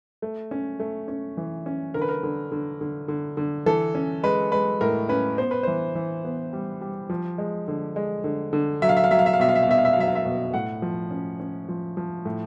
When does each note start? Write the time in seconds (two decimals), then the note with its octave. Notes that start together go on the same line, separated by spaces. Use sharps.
0.22 A3
0.51 C#4
0.80 A3
1.08 C#4
1.37 E3
1.66 C#4
1.94 D3 A#4
2.01 B4
2.09 A#4
2.23 D3
2.52 D3
2.81 D3
3.08 D3
3.37 D3
3.66 E3 A4
3.95 C#4
4.23 G#3 B4
4.52 G#3 B4
4.81 A2 A#4
5.09 C#4 B4
5.38 B3 C5
5.51 B4
5.63 E3 C5
5.95 E3
6.24 B3
6.53 G3
6.81 G3
7.09 F3
7.38 G#3
7.68 D3
7.96 G#3
8.24 D3
8.53 D3
8.82 F#3 E5
8.89 F5
8.97 E5
9.04 F5
9.11 F#3 E5
9.19 F5
9.26 E5
9.33 F5
9.39 B2 E5
9.49 F5
9.55 E5
9.63 F5
9.67 B2 E5
9.78 F5
9.85 E5
9.93 F5
9.96 F#3 E5
10.08 F5
10.15 E5
10.25 B2
10.54 A2 F#5
10.82 F3
11.11 C#4
11.40 C#4
11.68 F3
11.97 F3
12.25 A2